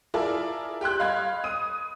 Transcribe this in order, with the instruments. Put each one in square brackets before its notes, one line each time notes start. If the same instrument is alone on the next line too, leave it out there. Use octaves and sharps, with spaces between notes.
[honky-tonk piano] E4 F4 G#4 A#4 D5 A5
G4 G5 C6 F#6
D#5 F5 B5 C6 G#6
D#6 D#7